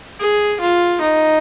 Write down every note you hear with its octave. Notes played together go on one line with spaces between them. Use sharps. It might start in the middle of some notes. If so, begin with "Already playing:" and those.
G#4
F4
D#4